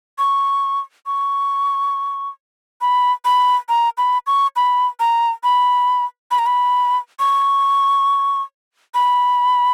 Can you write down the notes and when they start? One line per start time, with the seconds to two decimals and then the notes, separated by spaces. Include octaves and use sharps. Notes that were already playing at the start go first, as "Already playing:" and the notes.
0.18 C#6
1.06 C#6
2.81 B5
3.25 B5
3.69 A#5
3.98 B5
4.27 C#6
4.56 B5
5.00 A#5
5.44 B5
6.31 B5
6.39 A#5
6.46 B5
7.19 C#6
8.95 B5